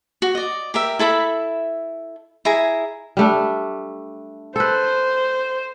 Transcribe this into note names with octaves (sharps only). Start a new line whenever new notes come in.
F#4
D5 D#5
G4 A#4 E5
E4 A4 E5 B5
E4 G#4 A#5
G3 A3 D4
A4 B4 C5